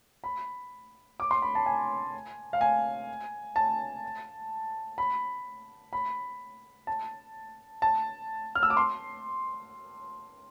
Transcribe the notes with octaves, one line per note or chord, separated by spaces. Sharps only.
B5
D6
C6
B5
A5
G#5
F5
G#5
A5
B5
B5
A5
A5
F6
E6
D6
C6